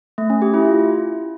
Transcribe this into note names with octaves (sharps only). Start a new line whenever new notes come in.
A3
C#4
G4
E4
F4